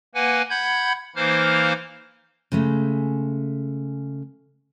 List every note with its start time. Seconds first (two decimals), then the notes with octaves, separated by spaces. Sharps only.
0.15 A#3 B4 F#5 G#5
0.50 F#5 B5 G6 G#6
1.16 E3 A#3 D#4 C5 F5 F6
2.52 C#3 G#3 A3